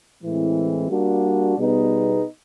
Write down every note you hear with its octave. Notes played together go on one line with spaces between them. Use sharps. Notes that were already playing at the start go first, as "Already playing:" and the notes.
A2 E3 G#3 C4 E4
G3 A#3 D4 F#4
B2 G3 B3 D#4 G#4